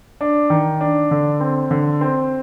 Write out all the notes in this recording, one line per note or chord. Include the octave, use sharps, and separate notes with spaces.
D4
D#3
D4
D3
C4
D3
C4